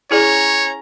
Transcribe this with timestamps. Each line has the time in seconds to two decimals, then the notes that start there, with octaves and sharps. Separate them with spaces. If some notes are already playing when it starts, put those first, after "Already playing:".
0.11 C#4 E4 G#4 C#5 D5 A#5